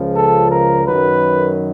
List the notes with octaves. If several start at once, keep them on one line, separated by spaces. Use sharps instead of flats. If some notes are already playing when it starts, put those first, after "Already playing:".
Already playing: C#2 C#3 F3
A4
A#4
F#2 D#3 F#3 B4